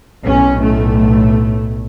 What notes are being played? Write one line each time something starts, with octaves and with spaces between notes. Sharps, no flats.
B1 A2 C#4
A3